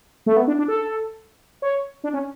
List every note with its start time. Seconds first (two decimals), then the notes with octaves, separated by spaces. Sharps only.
0.26 A3
0.37 B3
0.48 D4
0.58 D4
0.68 A4
1.62 C#5
2.04 D4
2.14 C#4